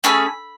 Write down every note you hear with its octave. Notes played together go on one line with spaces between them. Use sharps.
A3 C#4 G#4 B5